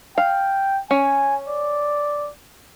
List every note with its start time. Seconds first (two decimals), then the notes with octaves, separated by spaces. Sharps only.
0.18 F5 G5
0.91 C#4 G#5
1.49 D5